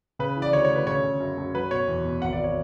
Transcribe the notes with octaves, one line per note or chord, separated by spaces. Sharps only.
C#3 B4
E3
D5
D2 C#5
C#5
D2
B4
C#3 C#5
C#3
F#2
F#2
F#3 B4
B2 C#5
E2
B2
G#1 F#5
D5
C#5